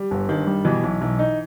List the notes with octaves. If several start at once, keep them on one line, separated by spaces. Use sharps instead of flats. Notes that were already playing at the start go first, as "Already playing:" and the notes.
Already playing: G3
G1
G2 D#3
G3
B2 E3
B1
B1
D#4